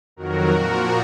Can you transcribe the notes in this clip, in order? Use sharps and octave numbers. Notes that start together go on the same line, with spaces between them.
F2 D#3 F#3 F#4 A#4
A#2 F3 F#4 A#4